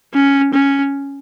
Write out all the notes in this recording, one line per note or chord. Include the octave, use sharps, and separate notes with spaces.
C#4
C#4